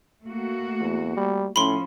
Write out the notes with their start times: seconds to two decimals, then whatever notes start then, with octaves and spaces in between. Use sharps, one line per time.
0.23 A3 A#3 F#4
0.80 E2
1.17 G3
1.56 A2 F3 C#4 B5 C6